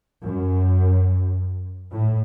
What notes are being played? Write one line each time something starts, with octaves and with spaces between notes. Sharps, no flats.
F#2
A2